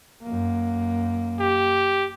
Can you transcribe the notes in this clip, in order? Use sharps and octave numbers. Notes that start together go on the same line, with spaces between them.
F#2 A#3
G4